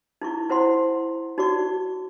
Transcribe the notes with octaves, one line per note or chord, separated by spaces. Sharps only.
D#4 E4 C#6
D#4 E4 C5 F#5 C6
D#4 F#4 D5 C#6